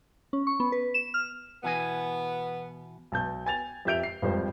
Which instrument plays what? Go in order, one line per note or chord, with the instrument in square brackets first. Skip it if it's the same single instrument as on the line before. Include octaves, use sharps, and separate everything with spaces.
[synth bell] C#4
C#6
B3
B4
E7
F6
[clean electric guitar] B2 E3 G#5 [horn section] B3
[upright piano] B1 A5 G6
G5 G#5 A6 F7
F2 G4 E5 G6 D7 F7
C7
G#1 F2 G3 C5